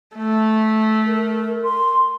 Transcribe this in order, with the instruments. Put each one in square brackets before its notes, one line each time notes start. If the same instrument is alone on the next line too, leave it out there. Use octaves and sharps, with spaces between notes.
[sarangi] A3
[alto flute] A#4
C6